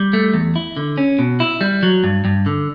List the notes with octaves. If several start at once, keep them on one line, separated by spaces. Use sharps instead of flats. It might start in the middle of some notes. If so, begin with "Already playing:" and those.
Already playing: G3
A3
E2
E4
D3
C#4
B2
E4
G3
F#3
G2
G2
D3